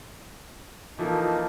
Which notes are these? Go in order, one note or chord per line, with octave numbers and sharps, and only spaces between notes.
E3 F3 A#3 D#4 A4